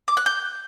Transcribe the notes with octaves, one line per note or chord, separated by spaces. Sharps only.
D6
F#6
G6